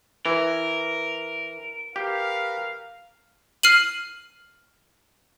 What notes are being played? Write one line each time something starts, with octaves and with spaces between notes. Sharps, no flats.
E3 A#4
G4 A#4 B4 F5
F6 C7 D#7 F#7